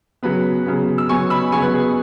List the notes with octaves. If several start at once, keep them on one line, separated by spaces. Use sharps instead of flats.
C#3 F#3 B3 B4
C#3 F#3 B3
E6
C#3 F#3 B3 G#5 C#6
B5 E6
C#3 F#3 B3 G#5 C#6
B4
G#4